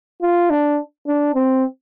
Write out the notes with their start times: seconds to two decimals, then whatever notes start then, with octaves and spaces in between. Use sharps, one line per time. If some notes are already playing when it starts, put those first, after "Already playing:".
0.22 F4
0.50 D4
1.07 D4
1.35 C4